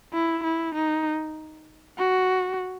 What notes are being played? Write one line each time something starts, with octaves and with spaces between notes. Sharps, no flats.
E4
E4
D#4
F#4